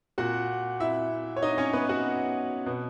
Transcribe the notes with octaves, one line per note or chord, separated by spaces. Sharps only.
A#2 F#4 F#5
E4 E5
C#5
D#4 D#5
C#4 C#5
B3 B4
F#4 F#5
B2